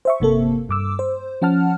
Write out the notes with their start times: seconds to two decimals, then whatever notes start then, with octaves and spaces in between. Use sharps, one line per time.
0.05 C5 E5 C#6
0.20 G1 C3 A#3 A4
0.69 G2 D6 E6
0.99 C5
1.42 F3 C#4 F#5 A5 F6